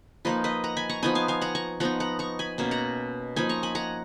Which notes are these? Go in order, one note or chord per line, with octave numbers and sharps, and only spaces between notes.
F3 A#3 D#4 B4 D#5
B4 D#5
F#5 A#5
G#5 B5
A#5 C#6
F3 B3 D#4 G#5 B5
F5 G#5
F5 G#5
F#5 A#5
A#5 C#6
F3 B3 D#4 F#5 A#5
F#5 A#5
A#5 C#6
G#5 B5
B2 A#3 C#4
F#5 A#5
F3 A#3 D#4 G#5 B5
A#5 C#6
G#5 B5
F#5 A#5